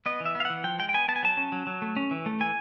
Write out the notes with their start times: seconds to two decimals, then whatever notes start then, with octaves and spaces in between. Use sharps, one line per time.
0.06 B3 D#5
0.20 E3
0.25 E5
0.35 B3
0.40 F5
0.45 E3 F#5
0.64 F3 G5
0.79 G#3 G5
0.89 G5
0.94 B3 G#5
1.08 B3 A5
1.16 G#5
1.23 F#3 A5
1.37 C#4
1.52 F#3
1.67 F#3
1.82 A3
1.96 C#4
2.11 E3
2.26 A3
2.40 E3 G#5